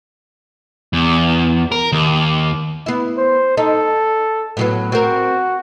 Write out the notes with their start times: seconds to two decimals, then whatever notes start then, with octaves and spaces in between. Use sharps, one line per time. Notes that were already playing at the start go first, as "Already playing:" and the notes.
0.93 E2
1.72 A#4
1.92 D#2
2.86 B3 E4
3.17 C5
3.57 D#4 A4
4.57 A2 F#3 B3
4.92 C4 F#4 A#4